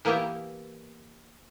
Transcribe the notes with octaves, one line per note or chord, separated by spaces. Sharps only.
E3 A#3 B3 E4 G4